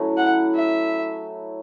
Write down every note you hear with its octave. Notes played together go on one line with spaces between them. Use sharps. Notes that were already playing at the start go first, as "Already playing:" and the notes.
Already playing: F#3 A3 C#4 E4
F#5
E5